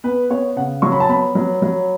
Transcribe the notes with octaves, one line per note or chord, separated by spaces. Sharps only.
B3 B4
B3 C#5
C#3 F#5
F#3 C#6
B5
A5
B3 B5
F#3
F#3